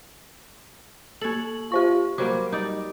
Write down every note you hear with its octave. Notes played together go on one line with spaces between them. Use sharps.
A#3 A4 C#5 F#7
F4 G4 C5 C#6
F#3 G3 A#3 C5 D6
G3 D#4 D5